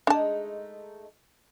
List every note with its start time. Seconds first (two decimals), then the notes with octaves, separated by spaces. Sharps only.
0.07 G#3 A3 D4 D#4 A5